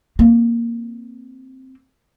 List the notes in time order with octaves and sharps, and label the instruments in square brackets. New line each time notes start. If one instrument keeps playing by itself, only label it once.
[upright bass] A#3 C4